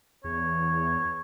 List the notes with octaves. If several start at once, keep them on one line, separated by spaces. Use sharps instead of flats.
E2 C#5